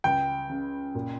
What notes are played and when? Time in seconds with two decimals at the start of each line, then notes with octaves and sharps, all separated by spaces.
0.04 C#2 G5
0.50 C#3
0.95 A#2